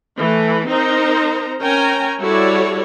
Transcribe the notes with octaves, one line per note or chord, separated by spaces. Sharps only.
E3 A3
C4 D#4 A#4 C5 A#5
C#4 A#4 C#5 G5 G#5 A#5
G3 E4 F#4 A4 C#5 D5